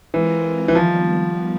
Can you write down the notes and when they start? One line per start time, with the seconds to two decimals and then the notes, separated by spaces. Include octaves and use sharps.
0.14 E3 G#3 C4 F4 A#4
0.68 E3
0.75 D#3 F3 G3 B3